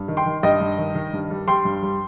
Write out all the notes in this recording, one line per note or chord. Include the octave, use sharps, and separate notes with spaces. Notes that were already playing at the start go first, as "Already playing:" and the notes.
Already playing: G2
D#3
G5 C6
D#3
G2 D#5 G5
G2
D#3
D#3
G2
G3
G3 G5 C6
G2
G3